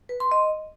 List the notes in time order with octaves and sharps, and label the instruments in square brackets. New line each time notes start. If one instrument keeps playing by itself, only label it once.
[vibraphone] B4
C6
D#5